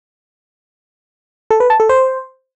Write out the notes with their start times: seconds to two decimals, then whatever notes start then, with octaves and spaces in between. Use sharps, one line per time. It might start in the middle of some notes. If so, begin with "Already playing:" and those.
1.51 A4
1.60 B4
1.70 A5
1.80 A4
1.89 C5